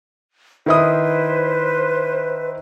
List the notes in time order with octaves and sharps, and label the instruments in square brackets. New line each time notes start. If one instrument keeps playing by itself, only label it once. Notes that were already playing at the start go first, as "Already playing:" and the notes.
[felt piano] D#3 E4 D#6 [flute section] B4 C5